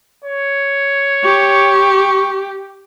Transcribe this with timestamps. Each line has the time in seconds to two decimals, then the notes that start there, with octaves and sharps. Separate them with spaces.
0.24 C#5
1.24 G4 C#6